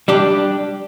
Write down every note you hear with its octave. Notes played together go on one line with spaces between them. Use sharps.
G3 D4 G4